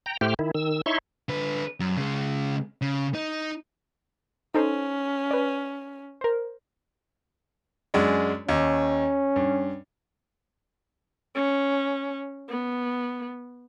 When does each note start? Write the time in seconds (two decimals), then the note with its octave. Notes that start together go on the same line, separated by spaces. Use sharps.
0.06 G5 A#5
0.21 A2 A3 G4 C5 G5 F6
0.39 D#3 E4
0.55 D#3 E6
0.86 D#4 E4 C#5 E5 C6 C#6
1.29 D3 B4
1.80 F#2
1.97 C#3 G#3
2.81 C#3
3.15 D#4
4.55 C#4 D#4 A4 C5
5.31 B4 D5
6.21 A#4 C5
7.94 F#2 G#3 D4
8.49 D#2 C#4
9.36 G2
11.35 C#4
12.49 B3